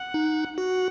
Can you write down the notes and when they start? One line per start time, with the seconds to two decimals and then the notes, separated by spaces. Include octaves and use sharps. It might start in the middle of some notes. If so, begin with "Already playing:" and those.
Already playing: F#5
0.14 D#4
0.58 F#4 F#5